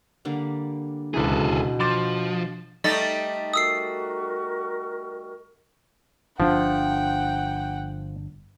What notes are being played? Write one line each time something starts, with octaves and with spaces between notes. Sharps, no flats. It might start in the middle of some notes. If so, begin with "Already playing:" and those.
D3 G3 A#3
D1 C#2 B2 E3 G#4 A4
F3 C6 D6 A6
G3 A3 D#4 D#5 A6
F#4 A#4 D#6 E6 C7
G1 F3 D4 F#5 G5